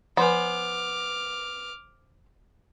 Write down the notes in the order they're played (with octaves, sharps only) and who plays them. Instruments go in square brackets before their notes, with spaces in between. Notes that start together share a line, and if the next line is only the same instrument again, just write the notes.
[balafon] F3 B4 [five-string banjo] B3 [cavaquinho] C5 G#5 [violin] D6 F6